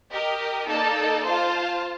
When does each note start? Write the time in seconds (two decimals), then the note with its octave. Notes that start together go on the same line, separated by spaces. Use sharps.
0.10 G4 A#4 D#5
0.67 A#3 D#4 A4 D5 A5
1.25 F4 C5 F5 A5